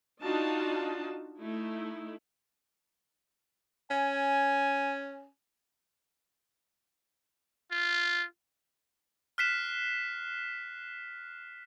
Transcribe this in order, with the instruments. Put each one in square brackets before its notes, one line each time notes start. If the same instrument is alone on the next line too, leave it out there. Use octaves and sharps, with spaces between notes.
[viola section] D4 D#4 F4 F#4 D#5 A5
A3 D#4 E4
[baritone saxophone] C#4 [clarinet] G#5
[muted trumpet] F4
[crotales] F6 F#6 B6 C7 E7